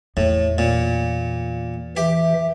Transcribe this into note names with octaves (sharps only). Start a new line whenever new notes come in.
E2 A2
A#2
E3 G4 E5